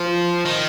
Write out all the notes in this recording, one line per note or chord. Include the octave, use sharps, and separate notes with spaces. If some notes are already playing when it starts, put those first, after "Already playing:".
Already playing: F3
D#3